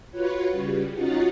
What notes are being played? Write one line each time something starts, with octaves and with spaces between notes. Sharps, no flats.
F4 F#4 B4 C#5
C#3 G3
C#4 D#4 F4 F#4 F#5 A6